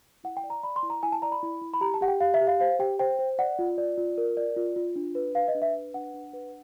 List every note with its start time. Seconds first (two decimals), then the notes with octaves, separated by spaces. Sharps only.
0.24 E4 F#5
0.37 G5
0.44 D5
0.50 A#5
0.63 D5 B5
0.76 C6
0.83 E4
0.90 A#5
1.03 E4 G#5
1.12 A5
1.22 D5 A#5
1.32 B5
1.43 E4
1.62 E4
1.74 B5
1.81 G4 A#5
1.94 A5
2.01 G4 F#5
2.08 G5
2.20 G4 F5
2.34 E5
2.41 G4
2.47 F5
2.60 C5 F5
2.79 G4 G5
2.99 C5 G5
3.19 C5
3.39 D5 F#5
3.59 F4
3.78 D5
3.98 F4
4.18 A#4
4.37 D5
4.56 F4
4.76 F4
4.96 D4
5.15 B4
5.35 B4 F5
5.48 D#5
5.55 D4
5.62 E5
5.74 B4
5.94 D4 F#5
6.14 D4
6.33 B4